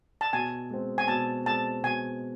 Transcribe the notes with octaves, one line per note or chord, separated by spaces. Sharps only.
A5
B2 G#5
G#3 C4
G#5
B2 A5
G#3 C4 A5
B2 G#5